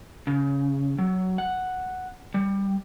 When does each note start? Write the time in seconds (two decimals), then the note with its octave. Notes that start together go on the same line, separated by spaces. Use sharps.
0.27 C#3
0.98 F#3
1.38 F#5
2.34 G3